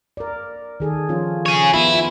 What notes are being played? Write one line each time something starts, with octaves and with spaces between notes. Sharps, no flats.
A#4 D5
D#3 G#4 A4
F3 C#4 F4
G#4 C#5
B3 E4 F4
F4